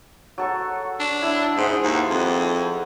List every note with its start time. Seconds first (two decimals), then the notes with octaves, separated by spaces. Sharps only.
0.38 F#3 A4 C#6
1.00 D4
1.22 E4 E5
1.57 G#2 B3 G#4 C5
1.83 D#2
2.10 F2